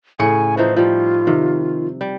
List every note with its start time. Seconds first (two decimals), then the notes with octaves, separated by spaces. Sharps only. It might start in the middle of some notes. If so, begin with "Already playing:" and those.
0.19 A2 C#3 G#5 C#7
0.57 E3 F3 D#4 C5
0.77 F3 G3 F4
1.27 C3 D#3
2.01 G3